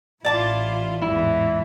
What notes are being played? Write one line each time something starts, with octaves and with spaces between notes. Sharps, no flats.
A1 A2 E4 F4 D5 A5 D6
E2 G#2 E3 E4